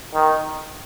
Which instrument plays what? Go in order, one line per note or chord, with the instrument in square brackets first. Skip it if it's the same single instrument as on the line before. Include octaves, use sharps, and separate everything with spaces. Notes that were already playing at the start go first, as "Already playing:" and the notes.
[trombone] D#3